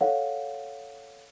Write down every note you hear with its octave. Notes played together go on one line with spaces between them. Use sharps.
A4 C#5 F5 F#5